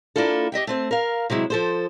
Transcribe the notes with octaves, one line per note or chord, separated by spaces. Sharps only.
A#3 D4 E4 F4 A4
G4 D#5 E5 G5
A3 C4 C5
A#4 F5
C3 F#3 G#3 E4
F3 A4 C5